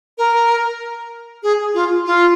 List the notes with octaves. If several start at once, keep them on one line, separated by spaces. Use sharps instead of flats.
A#4
G#4
F4
F4